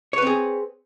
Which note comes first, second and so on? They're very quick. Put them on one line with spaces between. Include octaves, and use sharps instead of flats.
C#5 B4 C4 G#4